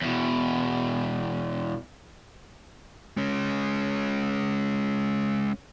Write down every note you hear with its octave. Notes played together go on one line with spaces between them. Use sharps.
E2 B2
G#3 C#4